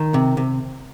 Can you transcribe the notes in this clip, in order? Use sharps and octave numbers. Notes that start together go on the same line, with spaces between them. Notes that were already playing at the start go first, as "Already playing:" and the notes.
Already playing: D#3
C3
C3